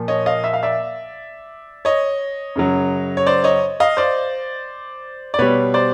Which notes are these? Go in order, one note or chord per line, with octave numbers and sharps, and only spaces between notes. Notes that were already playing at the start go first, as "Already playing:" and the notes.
Already playing: A#2 F3
C#5 D#5
D#5 F5
E5
F5
D5 E5
C#5 D#5
F#2 C#3 F#3
C#5
C5 D5
C#5 D#5
D#5 F5
C5 D5
D5
B2 G3 B4 C#5
C5 D5